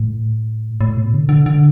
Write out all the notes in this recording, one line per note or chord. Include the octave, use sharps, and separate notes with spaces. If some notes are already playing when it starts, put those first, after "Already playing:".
Already playing: A2
A2
B2
D3
D3
D3